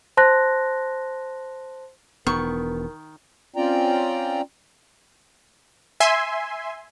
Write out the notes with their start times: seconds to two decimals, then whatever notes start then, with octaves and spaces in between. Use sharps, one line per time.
0.17 C5 A5 C6 F#6 A#6
2.27 E1 D#3 B3 A#4 C#6
3.56 C4 C#4 F4 D5 G5 A#5
6.00 E5 G#5 C6